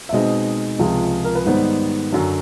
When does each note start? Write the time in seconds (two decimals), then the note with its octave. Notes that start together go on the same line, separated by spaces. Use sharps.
0.09 E5
0.13 B2 G#3 C4 D#4 D#5
0.79 C#2 C3 F3 G#3
1.24 A#4
1.35 B4
1.46 G#2 D#3 G3 B3 D#4 C5
2.12 F#2 D3 F#3